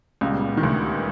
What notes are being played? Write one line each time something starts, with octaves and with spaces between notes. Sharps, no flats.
C#2 A#2 C#3 G3 B3
D#3
D2 D3